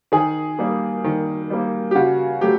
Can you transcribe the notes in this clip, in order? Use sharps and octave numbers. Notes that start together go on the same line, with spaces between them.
D#3 G#4
G3 A#3
D#3
G3 A#3
G4
C#3 F#4
F#3 A3 G4